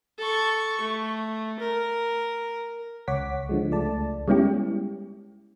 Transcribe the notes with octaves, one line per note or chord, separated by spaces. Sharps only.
A4 C#6
A3
A#4
C#2 C#5 F#5 D6 B6
D3 F3 G#3
C#2 A3 D5 A5
G3 G#3 B3 C#4 E4 G4